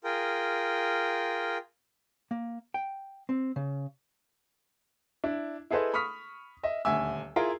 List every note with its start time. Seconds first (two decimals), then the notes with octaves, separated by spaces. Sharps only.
0.04 F4 G#4 A#4 G5
2.31 A#3
2.74 G5
3.29 C4
3.56 C#3
5.24 D4 E4
5.71 E4 G#4 A4 B4 C5 D#5
5.94 B5 C#6 D#6 F6 B6
6.63 D#5 E5
6.85 D#1 D2 E5 G#5 E6
7.36 E4 F4 G#4 A#4